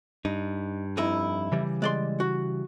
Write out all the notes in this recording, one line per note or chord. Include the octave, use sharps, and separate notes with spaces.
G2 D#4
F2 D#4 E4
C#3 E3 G3
G#3 D5 C6
F#4